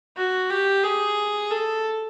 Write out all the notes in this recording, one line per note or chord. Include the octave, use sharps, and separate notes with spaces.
F#4
G4
G#4
A4